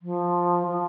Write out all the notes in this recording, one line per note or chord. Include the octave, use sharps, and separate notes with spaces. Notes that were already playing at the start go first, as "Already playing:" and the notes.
F3
F3